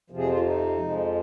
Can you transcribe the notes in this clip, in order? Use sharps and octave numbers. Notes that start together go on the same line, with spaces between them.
F2 C3 F3
G#4
F4
D#4
F2 F3 G#3